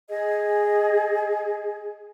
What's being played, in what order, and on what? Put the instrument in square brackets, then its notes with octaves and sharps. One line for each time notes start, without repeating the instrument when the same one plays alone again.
[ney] G#4 [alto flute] D#5